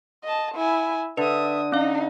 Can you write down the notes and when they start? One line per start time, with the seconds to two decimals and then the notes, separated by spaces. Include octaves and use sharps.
0.24 D#5 A5
0.55 E4 G#5
1.17 D3 B4 E5 D#6
1.72 C#4 D#4 F5